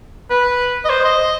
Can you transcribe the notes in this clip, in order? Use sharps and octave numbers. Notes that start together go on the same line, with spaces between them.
B4
D#5
C5
D#5